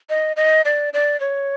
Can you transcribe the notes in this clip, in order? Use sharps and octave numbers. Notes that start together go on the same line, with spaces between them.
D#5
D#5
D5
D5
C#5